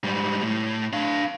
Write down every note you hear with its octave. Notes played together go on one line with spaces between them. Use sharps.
G#2 G3
A2
D4 F5